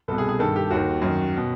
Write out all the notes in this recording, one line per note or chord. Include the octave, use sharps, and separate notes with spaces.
C2 B2 A4
G#4
G#4
G2 D#3 A4
G4
D#2 D#3 F#4
F#2 D#3
B2